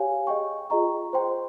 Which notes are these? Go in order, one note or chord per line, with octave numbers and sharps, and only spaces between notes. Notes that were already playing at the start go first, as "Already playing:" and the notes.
Already playing: G4 C#5 F5 G#5
G#4 D#5 G5 C#6
F4 G#4 D#5 A#5 C#6
C5 G5 C6